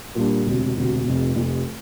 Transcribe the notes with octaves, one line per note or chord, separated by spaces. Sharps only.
A#2 G3 D4
E1 D2 C3
E1 D2 C3
F1 F2 C3
F1 F2 C3